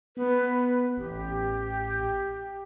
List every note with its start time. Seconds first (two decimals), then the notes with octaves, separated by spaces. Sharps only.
0.17 B3 B4
0.97 A1 G4